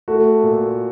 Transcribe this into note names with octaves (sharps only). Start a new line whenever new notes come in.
A3 F#4
A#2